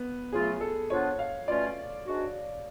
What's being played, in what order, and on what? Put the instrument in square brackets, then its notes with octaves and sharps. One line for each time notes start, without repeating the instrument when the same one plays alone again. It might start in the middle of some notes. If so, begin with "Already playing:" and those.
Already playing: [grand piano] B3
[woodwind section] C#3 F#3 A3 F4 [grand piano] G#4
[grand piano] A4
[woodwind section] F3 B3 D4 F4 [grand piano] C#5
[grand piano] F5
[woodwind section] B2 A3 C#4 F4 [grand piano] D5
[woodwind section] G#2 G#3 D4 F#4